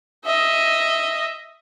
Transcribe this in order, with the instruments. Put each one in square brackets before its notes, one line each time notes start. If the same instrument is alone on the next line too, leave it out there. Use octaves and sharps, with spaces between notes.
[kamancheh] D#5 E5